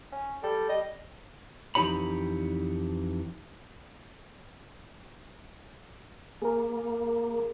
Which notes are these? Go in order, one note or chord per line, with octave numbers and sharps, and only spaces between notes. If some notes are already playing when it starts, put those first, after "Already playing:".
C#4
G3 A4
G3 D#5
F2 E3 D#4 G4 C#5 B5
A#3 G#4 A#4